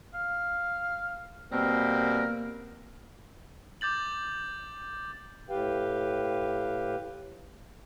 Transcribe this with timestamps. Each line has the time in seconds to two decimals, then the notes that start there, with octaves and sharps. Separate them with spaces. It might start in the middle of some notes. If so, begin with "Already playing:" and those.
0.14 F5
1.52 B2 G3 A#3 C4 A#4
3.81 D6 G6 A6 F#7
5.50 A2 G4 B4 F5 G5